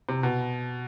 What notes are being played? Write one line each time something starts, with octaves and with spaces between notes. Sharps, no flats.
C3
B2